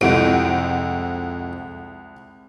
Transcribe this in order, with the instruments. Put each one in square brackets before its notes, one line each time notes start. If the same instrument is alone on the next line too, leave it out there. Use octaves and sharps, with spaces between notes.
[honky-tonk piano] C2 F#5 D7 [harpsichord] F2 [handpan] G#3 C4 [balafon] E4 G4